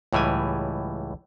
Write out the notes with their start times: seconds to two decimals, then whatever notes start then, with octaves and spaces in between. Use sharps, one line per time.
0.13 C#2 A2 E3 G3 G#5